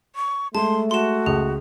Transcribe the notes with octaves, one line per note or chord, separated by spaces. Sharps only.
C#6
G#3 A3 A5 C6
F#4 C6 E7
C#2 G#4